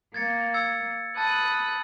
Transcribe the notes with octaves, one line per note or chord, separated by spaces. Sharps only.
A#3 G#6 A6 C#7
E6 G#6 C#7
A5 B5 D#6 F#6 A6